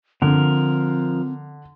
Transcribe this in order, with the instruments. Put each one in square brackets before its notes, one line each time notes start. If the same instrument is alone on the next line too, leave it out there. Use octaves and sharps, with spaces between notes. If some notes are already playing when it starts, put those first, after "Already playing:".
[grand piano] D3 [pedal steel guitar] F3 A#4 [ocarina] C4